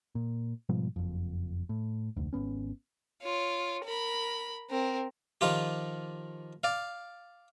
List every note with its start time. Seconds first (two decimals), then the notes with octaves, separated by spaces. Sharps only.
0.15 A#2
0.69 G#2 B2 F3 G3
0.96 F#1 F2
1.69 A2
2.16 F1 D2
2.33 G#1 B2 B3 C#4
3.22 F4 C#5
3.85 A#4 B5
4.70 C4 A#4
5.41 D#3 F3 F4 G4
6.64 D5 F5